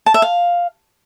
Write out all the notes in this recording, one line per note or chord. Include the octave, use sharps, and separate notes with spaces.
A5
E5
F5